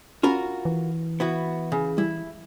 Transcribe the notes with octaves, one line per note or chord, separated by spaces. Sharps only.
C#4 F4 F#4 A#4 B5
E3
B3 E4 F#4
C#3
G3 E4